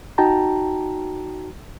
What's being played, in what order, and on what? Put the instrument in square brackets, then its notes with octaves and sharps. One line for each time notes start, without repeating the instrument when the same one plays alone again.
[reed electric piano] D#4 F#4 G5 A5 A#5